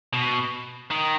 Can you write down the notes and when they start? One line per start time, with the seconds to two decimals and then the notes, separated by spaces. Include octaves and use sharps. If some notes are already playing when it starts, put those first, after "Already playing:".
0.13 B2
0.91 D#3